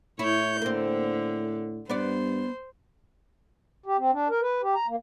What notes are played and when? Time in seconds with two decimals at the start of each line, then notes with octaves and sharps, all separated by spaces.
0.19 A2 E4 C#5 G6
0.62 D3 A#3 C4
1.89 G2 B3 C5 D5
3.86 G4
3.98 C4
4.13 D4
4.29 A#4
4.41 B4
4.62 G4
4.75 A#5
4.87 A#3